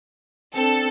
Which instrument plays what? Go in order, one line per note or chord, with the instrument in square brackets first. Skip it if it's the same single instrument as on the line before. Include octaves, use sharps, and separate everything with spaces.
[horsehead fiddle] C4 D4 [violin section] A4